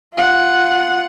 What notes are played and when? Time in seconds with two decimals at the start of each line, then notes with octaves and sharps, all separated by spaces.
0.14 F4 F#5